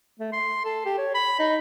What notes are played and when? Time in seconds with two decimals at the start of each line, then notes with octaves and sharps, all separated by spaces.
0.20 A3
0.33 C6
0.65 A4
0.86 G4
0.98 C#5
1.15 B5
1.39 D#4